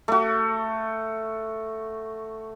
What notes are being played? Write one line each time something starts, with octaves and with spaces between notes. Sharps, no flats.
A3 F#4